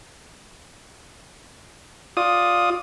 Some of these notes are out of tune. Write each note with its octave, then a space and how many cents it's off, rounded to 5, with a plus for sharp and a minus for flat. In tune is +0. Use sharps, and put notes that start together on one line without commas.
F4 +15 D5 +0 D#6 +0